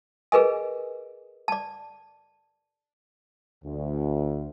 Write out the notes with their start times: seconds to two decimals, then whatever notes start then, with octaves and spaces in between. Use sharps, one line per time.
0.32 G#4 A#4 B4 D#5 G#5
1.48 D5 A5
3.64 D2